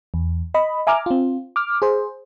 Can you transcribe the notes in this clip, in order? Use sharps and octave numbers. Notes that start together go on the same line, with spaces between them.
E2
D#5 B5
E5 G#5 A#5 D6 F6
C4 F4
D6 F6
G#4 C5